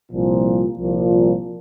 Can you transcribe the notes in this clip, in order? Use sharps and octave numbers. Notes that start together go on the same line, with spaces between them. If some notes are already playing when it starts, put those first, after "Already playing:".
C2 A#2 F3
C2 A#2 F3